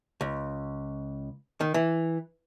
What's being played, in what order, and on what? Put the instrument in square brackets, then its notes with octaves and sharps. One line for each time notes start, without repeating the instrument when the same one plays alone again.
[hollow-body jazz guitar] C#2
D#3
E3